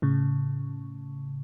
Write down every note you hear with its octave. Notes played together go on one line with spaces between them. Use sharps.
A2 C#3